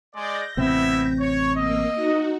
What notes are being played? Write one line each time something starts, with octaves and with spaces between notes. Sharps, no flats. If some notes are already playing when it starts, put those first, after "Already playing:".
G#3 D5 G6 A#6
A1 C3 B3 C4 E4 E5
C#5
A#3 D#5 E6
D#4 F#4